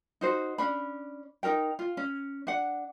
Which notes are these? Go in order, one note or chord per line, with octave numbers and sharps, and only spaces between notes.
D#4 F#4 C5
C#4 D4 B5
D#4 A4 A#4 G5
F4
C#4
D4 F#5